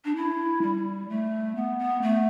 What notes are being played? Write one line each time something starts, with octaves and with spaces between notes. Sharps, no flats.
D4
E4
G3
A3
B3
B3
A3